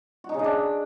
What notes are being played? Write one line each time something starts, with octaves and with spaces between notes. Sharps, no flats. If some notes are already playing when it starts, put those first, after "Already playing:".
F#4
D#4
C#3
D#4
D4